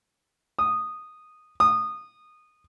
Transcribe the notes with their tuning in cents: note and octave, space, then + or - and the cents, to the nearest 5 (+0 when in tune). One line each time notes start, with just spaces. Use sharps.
D#6 -10
D#6 -20